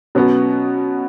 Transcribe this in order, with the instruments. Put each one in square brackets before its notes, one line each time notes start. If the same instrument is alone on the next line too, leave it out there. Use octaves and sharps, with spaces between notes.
[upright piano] B2 F#3 B3 [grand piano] C#4